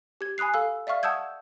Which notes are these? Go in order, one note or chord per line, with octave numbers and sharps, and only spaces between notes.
G4 G#6
G#5 B5 D#6 F#6 C7
A4 F5 E6
D5 E5 F5 C#6 F6
F#5 A5 D#6 E6 G6 G#6